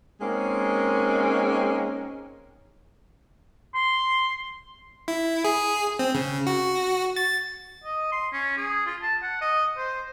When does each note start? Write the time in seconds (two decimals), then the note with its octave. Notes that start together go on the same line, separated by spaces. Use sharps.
0.21 G#3 A#3 C4 C#4 D#4
3.75 C6
5.08 E4
5.44 G#4
5.99 C4
6.15 C#3
6.47 F#4
7.16 A6
7.84 D#5
8.12 C6
8.33 C#4
8.57 G#4
8.87 F4
9.02 A5
9.23 F#5
9.41 D#5
9.77 C5